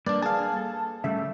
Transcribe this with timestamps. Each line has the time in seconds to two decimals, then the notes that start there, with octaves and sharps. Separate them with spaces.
0.06 G3 A#3 D4 B4 D5
0.22 G#4 F5 A5
0.57 A4
1.04 C#3 G3 A3 E5